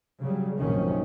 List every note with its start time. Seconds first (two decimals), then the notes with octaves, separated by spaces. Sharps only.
0.21 C#3 F#3 G3
0.58 F1 A#1 F#2 D#3 F3 C#4